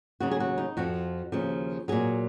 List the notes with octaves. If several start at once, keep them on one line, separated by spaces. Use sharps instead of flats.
D#2 C#3 F#3 F#4
G#4
F#4
D#4
F2 F3 F#4
D#2 C#3 F3
A#2 F#3 G#4